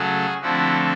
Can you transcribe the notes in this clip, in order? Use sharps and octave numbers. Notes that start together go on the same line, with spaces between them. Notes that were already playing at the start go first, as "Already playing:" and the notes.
Already playing: C#3 F#3 A3 F#4 G#4
D3 F3 A3 C4 E4 F#4